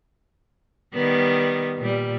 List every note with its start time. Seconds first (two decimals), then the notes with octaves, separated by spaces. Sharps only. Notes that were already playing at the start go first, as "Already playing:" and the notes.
0.94 D#3 G3 B3
1.78 A#2 G3